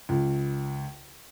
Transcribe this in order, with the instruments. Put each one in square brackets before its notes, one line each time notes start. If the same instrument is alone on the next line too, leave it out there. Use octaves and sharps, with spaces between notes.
[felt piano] C#2